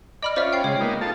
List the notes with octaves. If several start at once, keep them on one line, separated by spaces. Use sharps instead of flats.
D5 D#5 B5 F6
C#4 F4 C5 D5 E5
G5 C7
C#3 G#3 C#5
A#3 B3 D#4
F4 A4 A5